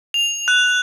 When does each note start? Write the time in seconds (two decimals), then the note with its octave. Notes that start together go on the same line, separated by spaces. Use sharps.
0.14 F7
0.48 F#6